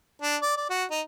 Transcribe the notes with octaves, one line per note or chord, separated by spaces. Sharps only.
D4
D5
D5
F#4
D#4